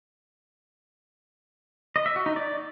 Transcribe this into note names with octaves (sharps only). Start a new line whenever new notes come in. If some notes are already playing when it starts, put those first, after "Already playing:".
D#5
E5
F#4
D#4
D5